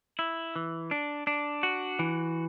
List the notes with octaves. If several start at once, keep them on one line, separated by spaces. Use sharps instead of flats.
E4
E3
D4
D4
F#4
E3